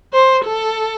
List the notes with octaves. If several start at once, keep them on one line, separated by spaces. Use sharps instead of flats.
C5
A4